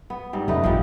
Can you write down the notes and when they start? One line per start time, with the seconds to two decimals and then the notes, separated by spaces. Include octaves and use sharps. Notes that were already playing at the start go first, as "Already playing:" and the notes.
0.10 B3
0.33 G#2 G3
0.48 F#2 A3 D#4 B4
0.64 A1 A#2 F3 G3 F4